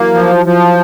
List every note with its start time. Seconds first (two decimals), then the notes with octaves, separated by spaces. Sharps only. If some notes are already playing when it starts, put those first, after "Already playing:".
Already playing: E3 F#3 A#3
0.14 F3
0.46 F3